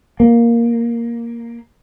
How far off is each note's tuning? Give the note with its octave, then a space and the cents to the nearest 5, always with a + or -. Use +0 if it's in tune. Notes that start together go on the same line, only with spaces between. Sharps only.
A#3 +5